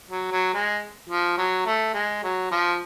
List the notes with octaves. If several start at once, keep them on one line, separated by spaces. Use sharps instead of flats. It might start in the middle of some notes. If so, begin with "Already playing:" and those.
F#3
F#3
G#3
F3
F#3
A3
G#3
F#3
F3